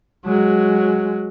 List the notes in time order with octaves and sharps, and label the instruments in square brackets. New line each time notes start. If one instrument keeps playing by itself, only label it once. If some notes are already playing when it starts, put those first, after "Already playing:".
[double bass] F#3 G#3